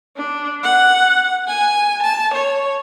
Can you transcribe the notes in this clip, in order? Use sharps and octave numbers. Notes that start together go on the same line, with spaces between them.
D4
F#5
G#5
A5
C#5